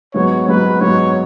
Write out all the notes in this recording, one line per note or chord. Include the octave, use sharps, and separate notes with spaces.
G#2 F#3 B3 C#5
G#2 F#3 B3 B4
G#2 F#3 B3 C#5